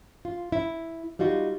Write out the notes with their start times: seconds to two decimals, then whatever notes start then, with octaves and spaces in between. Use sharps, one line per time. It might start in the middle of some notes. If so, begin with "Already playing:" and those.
0.25 F4
0.52 E4
1.19 G3 D#4 F4 F#4